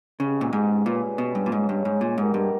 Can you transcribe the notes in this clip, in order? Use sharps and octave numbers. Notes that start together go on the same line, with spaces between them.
C#3 G#3 B3 G4
A#2
G#2
A#2 G3 C#4 G#4 B4
B2
G2
A#2
G#2 C#3 G#3 C#4
G2
G#2
A#2
G#2 G#3 B3 G4 A#4
G2